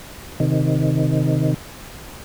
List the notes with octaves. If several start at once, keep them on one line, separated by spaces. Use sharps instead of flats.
C3 D#3